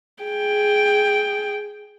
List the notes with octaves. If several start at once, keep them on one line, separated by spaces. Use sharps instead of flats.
G#4 G5